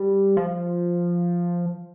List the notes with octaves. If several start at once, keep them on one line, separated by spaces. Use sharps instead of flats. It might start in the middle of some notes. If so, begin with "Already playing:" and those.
Already playing: G3
F3